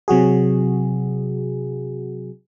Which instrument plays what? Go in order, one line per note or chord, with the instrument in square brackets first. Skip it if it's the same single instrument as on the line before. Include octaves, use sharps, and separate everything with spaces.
[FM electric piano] C3 F#3 F#4 G#4